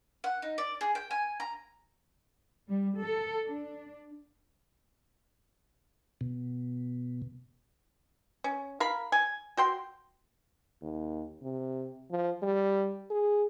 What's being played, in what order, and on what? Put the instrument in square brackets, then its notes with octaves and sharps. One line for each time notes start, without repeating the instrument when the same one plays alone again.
[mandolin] F#5
D#4
D5
G#4
G5
G#5
A#5
[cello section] G3
A4
D4
[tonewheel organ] B2
[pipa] C#4
A#4 F5 B5
G#5
F#4 G5 C6
[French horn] D#2
C3
F3
G3
G#4